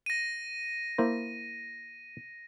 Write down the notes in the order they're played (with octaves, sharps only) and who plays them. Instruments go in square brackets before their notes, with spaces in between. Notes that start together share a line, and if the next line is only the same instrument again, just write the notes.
[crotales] A#6 D#7
[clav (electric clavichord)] A#3 E4 C5